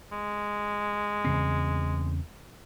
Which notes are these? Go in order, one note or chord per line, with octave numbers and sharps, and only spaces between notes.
G#3
E2 C#3 C4